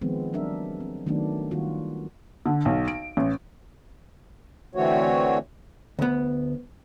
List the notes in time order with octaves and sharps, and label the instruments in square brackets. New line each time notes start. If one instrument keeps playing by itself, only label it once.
[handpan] D#3 F3 G#3 B3 C4
F#3 G3 D4 A#4 E5
C4
D#3 F#3 A3 B3 D4 D#4
D#3 G3 A#3 F4 F#4
[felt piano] D3
B1
D7
A1
[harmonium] D3 E3 A3 C4 F#4 C#5
[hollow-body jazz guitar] D2 B3